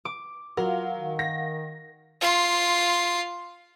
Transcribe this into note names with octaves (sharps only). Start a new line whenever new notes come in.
D6
F#3 F4 A#4 F5 F#5
D#3
A#6
F4 C6